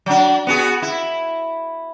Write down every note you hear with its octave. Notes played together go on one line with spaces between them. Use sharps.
F#3 D4
B3 F#4 G#4
E4